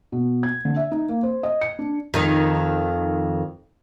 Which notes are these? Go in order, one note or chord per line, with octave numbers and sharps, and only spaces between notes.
B2
G#6
D3
E5
D#4
A#3
C5
D#5
C#7
D4
F2 D#3 D#4